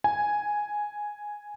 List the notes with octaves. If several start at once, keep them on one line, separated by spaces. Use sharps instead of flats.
G#5